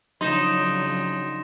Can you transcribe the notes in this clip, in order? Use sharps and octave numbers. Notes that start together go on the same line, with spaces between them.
C#3 F3 F#3 D4 D#4 C6 A#6 E7